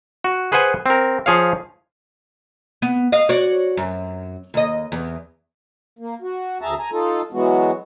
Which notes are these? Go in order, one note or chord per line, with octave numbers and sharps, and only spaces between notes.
F#4
G#4 B4 C5 F#5 G#5
C4 A#4
F3 G#4 C#5 F5
B3
D#5 F5
F#4 C#5 D5
F#2
D#2 D#5
E2
A#3
F#4
D2 G#4 E5 A5 A#5
G#5 A#5
D#4 F4 A4
E3 F#3 G#3 B3 F#4